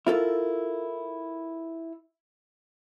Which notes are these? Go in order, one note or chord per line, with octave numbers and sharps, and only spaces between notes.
E4 F4 A4 A#4